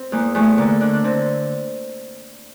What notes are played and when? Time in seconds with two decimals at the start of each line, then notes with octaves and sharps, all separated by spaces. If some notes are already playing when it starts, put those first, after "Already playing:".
Already playing: C4
0.12 E2 A#3
0.35 E2 A3
0.58 D3 A#3
0.81 D3 D4
0.93 D4
1.04 D3 C4